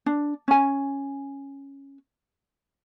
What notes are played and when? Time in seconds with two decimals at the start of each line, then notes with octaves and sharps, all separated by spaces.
0.06 D4
0.48 C#4 G#5